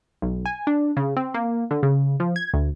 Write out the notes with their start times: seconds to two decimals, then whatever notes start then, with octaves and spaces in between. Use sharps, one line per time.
0.22 B1
0.46 G#5
0.67 D4
0.97 C#3
1.17 C4
1.34 A#3
1.71 D3
1.83 C#3
2.20 F3
2.36 G#6
2.54 D2